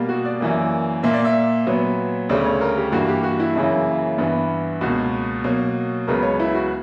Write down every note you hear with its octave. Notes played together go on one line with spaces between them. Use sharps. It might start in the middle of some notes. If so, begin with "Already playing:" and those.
Already playing: B2 G3 A#3
F#4
D5
F#2 E3 A#3
A#2 A#3 E5
D5
E5
A#2 F#3 B3
D2 C#3 G3 D5
C#5
A#4
G4
G2 E3 A#3 F#4
G4
F#4
E4
F#2 C#3 E3 A#3
G2 E3 B3
C#2 B2 A#3 F#4
B2 F#3 A#3
C#2 C#3 F#3 B3 A#4
C#5
E4
F#4